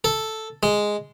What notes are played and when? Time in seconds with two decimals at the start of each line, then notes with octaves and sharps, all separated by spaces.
0.04 A4
0.63 G#3